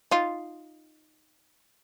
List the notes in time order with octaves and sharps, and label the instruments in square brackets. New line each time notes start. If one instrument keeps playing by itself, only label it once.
[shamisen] D#4 F4